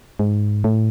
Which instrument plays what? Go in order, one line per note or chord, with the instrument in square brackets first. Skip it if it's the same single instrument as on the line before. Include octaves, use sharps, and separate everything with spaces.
[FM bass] G#2
A2